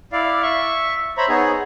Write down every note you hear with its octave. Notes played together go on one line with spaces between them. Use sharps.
E4 D5 F5
E5 C#6
C5 C#5 E5 A#5 B5
B3 D#4 G#4 C#5